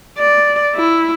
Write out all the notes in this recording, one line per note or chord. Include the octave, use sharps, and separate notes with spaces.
D5
E4